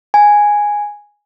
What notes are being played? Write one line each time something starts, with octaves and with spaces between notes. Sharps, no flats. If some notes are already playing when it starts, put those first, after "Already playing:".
G#5